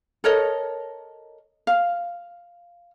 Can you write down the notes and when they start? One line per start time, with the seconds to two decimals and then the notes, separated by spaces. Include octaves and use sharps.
0.24 A4 A#4 C#5 D#5
1.67 F5